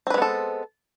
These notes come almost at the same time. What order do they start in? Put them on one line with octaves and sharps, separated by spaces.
C4 B4 G#3 B3 A4